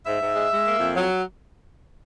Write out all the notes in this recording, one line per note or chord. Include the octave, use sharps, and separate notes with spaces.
G#2 E5
G#2
G#3
G#3
A#3
F2
F#3